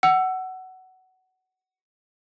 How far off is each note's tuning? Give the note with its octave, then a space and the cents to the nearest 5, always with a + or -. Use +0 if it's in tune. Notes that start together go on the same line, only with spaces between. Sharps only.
F#5 +15 E6 +15